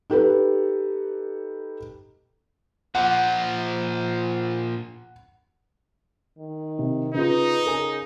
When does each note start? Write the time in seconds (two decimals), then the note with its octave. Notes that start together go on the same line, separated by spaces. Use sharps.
0.10 D#4 G4 A4 B4
2.95 A#2 F3 F#5
6.38 D#3
6.79 C3
7.14 C#3 D#4 F4 B4
7.66 C#3 A#4 G#5